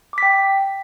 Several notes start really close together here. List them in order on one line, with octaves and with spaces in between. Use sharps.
D6 B6 G5